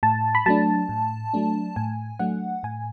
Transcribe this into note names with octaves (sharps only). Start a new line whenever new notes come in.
A2 A5
B5
F#3 A3 D4 A5
A2
F#3 A3 D4
A2 G#5
F#3 A3 D4 F#5
A2 G#5